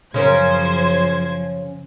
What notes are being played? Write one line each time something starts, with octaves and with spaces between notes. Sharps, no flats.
F#2 C#3 F3 C#4 A#4 C5 G#6